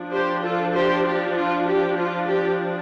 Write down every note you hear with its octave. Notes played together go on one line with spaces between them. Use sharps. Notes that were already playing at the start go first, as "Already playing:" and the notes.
Already playing: F3 D4
G4 C5
F4 A4
G4 C5
G4
F4
G4
F4
G4